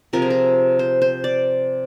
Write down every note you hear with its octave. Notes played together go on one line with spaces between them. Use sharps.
C3 F3 C4 A#4
G#4
A#4
C5
C5
D5